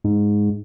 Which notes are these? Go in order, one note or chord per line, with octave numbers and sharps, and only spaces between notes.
G#2